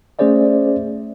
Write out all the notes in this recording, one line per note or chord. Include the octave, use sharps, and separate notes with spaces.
A3 C#4 G#4 C5 D5 E5